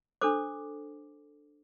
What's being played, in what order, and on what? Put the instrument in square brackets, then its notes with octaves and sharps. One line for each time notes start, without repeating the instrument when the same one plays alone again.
[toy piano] D4 A4 C5 D6